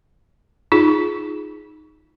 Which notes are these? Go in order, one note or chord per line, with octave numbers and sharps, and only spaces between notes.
D#4 F4 G#4